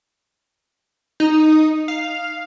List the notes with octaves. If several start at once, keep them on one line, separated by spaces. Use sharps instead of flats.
D#4
F5